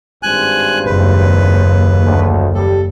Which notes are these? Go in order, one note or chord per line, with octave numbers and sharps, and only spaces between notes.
G#1 G2 C5 G#5 F#6
F#1 D#2 B4
D2
G3 G4 A4